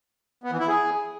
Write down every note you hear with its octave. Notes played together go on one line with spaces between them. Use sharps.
B3
E3
E4
G#4